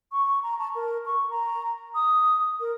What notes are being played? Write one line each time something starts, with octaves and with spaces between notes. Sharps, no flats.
C#6
A#5
A5
A#4
C#6
A#5
D#6
A#4